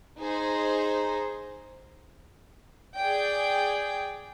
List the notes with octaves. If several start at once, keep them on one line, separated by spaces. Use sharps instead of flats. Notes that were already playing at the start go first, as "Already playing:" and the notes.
D#4 G#4 C5
G#4 D5 G5